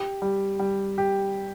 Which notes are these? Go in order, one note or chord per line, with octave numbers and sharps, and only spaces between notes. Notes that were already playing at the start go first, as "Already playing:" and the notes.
Already playing: G4
G3
G3
G4